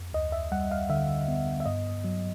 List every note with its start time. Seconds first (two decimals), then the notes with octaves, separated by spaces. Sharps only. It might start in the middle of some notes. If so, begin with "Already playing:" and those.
Already playing: F2
0.13 D2 D#5
0.32 E5
0.52 G3 F#5
0.71 F5
0.90 D3 E5
1.28 B3
1.60 E5
1.66 G2 D#5
2.04 F#3